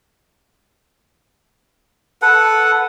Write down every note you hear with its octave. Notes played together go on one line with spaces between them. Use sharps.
A4 B4 F#5